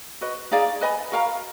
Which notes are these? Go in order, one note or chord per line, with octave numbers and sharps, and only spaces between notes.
F#4 B4 D#5
D#4 G#4 D5 F5
B4 D#5 G#5 B5
F#4 A#4 F5 A#5